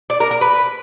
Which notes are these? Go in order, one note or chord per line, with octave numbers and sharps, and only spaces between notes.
D5
A#4
A#4
B4